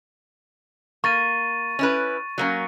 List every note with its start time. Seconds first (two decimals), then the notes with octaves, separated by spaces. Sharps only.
1.04 A#3 C#6 A6 D#7
1.79 C#4 E4 B4
2.38 F#3 A#3 C#4